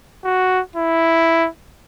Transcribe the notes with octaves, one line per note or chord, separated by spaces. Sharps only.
F#4
E4